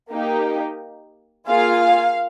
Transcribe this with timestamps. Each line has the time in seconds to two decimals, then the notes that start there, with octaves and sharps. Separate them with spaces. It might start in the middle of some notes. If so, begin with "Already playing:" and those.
0.10 A#3 D#4 G4
1.47 A#3 F4 G#4 F5